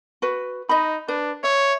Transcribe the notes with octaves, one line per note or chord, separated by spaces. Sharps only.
F#4 B4
D#4 D#5 B5
D4 B4
C#5 E5